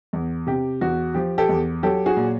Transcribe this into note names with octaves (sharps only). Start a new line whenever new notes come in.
E2
C3 G4
E2 F#4
F3 G4
G4 A4
E2
F#3 G4 A4
F#4 G#4
A#2